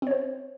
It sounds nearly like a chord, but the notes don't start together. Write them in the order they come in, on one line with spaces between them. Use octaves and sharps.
C4 C#5 C5